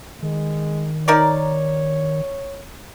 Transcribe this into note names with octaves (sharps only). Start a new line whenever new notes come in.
D#3 G#3
D#4 A#4 C#5 D5